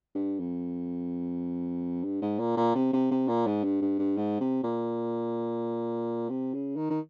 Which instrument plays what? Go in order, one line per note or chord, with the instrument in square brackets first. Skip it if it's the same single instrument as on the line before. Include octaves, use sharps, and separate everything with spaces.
[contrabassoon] G2
F2
G2
G#2
A#2
A#2
C3
C3
C3
A#2
G#2
G2
G2
G2
G#2
C3
A#2
C3
C#3
D#3
D#3